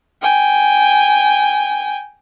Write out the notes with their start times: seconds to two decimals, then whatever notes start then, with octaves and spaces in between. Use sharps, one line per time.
0.22 G5 G#5